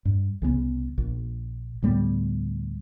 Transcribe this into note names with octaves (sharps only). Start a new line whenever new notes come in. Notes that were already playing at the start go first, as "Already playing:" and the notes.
G2
C2 C#3 G#3 B3
A#1
D2 A2 G3 B3